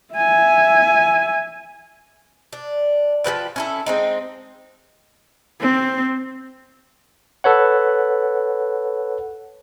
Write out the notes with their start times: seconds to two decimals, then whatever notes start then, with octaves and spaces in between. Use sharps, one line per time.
0.14 E5 G#5
2.53 D4
3.24 F3 G#3 B4 G5
3.56 C#4 E4 A4
3.86 G#3 C4 D#4
5.61 C4
7.44 A4 B4 C#5 F#5